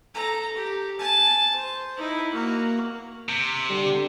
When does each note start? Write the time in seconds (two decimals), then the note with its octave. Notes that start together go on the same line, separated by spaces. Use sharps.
0.14 A4 A#5
0.55 G4
0.99 G#5 A5
1.56 C5
1.97 D#4 E4
2.33 A#3 F#4
3.29 C3
3.70 D3 G3